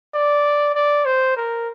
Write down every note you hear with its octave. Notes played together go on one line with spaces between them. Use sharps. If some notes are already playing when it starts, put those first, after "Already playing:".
D5
D5
C5
A#4